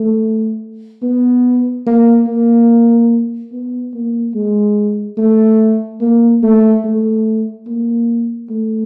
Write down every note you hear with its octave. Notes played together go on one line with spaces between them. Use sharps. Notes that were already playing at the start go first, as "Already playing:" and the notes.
Already playing: A3
B3
A#3
A#3
B3
A#3
G#3
A3
A#3
A3
A3
A#3
A3